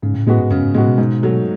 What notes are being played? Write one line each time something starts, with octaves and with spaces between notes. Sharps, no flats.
G#2 C#3
A2
A2 G#3 B3 F#4
G#2
F#2 C#3
G#2
A2 G#3 B3 F#4
B2
G#2
F#3 A3